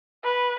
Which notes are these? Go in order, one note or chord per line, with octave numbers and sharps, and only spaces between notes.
B4